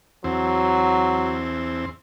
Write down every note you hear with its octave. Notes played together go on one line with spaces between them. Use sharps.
E2 F#3 C4